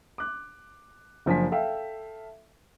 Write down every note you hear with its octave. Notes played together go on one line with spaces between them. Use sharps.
D6 F#6
F#1 F3 D4 G#5 B6
A4 E5 F5 G5